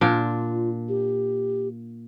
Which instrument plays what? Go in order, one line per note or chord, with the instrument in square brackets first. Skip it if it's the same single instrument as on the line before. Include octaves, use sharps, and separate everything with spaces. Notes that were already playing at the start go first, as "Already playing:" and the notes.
[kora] A#2 D4 [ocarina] F4
[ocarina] G4